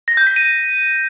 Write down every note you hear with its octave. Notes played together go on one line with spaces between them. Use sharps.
A#6
G6
B6
D#7